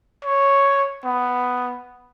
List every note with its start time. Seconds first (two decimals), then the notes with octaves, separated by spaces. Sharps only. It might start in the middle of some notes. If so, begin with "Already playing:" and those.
0.25 C#5
1.05 B3